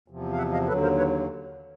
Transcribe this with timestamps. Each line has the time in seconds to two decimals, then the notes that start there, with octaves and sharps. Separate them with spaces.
0.08 E2 C3 F3
0.33 F5
0.38 E5 F#5
0.53 D#5 F5
0.68 D#2 D3 F#3 A4 B4
0.83 A#4 C5
0.98 B4 C#5